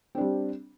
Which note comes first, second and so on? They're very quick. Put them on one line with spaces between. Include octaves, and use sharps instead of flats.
C4 D4 G3